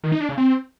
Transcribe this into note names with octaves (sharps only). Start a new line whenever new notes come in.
D#3
D#4
D4
C#3
C4